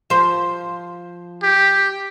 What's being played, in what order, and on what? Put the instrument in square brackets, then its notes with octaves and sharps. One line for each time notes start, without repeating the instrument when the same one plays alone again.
[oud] F3 C5
[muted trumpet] G4